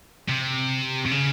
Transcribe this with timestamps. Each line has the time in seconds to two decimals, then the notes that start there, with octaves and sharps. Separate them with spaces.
0.28 C3
1.06 C3
1.11 C#3